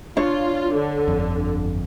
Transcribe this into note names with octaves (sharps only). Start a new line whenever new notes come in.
D4 F4 C#5
D3
G1 F2